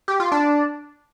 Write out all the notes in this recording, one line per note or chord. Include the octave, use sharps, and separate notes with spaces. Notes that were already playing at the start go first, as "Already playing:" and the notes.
G4
F4
D4